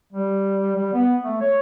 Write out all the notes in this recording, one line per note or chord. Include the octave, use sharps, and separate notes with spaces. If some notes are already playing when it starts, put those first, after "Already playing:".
G3
G3
B3
A3
C#5